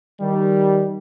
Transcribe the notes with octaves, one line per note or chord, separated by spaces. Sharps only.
D#3 G3